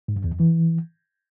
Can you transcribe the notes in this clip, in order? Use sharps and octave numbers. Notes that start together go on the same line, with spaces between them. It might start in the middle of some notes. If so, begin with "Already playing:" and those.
G#2
G2
E2
F2
E3